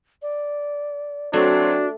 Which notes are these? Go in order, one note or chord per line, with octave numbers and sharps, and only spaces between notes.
D5
F#3 A3 C4 D4 F#4